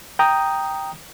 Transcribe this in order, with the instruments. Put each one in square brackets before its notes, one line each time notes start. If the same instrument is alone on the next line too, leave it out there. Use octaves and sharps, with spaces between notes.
[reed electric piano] G5 A#5 D#6